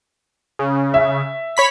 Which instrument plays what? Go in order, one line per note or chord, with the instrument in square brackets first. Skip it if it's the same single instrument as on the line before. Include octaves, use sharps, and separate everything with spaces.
[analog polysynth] C#3
[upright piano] E5
[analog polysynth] C#5 B5 B6